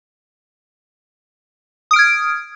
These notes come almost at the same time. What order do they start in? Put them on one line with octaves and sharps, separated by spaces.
D#6 D7 F6 G#6